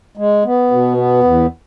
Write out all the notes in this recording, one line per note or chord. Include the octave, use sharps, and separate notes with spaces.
G#3
B3
B2
B3
E2